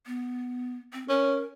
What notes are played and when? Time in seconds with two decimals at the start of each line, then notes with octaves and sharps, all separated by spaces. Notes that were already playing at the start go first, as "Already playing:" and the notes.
0.06 B3
0.93 C4
1.09 C#4 A#4